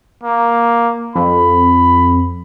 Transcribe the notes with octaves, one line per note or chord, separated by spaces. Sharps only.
A#3
F2 B5